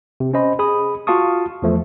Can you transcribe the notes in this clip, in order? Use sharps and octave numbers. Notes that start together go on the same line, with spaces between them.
C3
C#4 C5 D#5 B5
G#4 B5 D#6
F4 F#4 F5 A5 C#6 D#6
E2 F3 A3